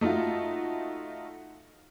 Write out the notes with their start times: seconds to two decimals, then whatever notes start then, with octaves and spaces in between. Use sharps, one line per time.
0.01 A3 D#4 F4 F#4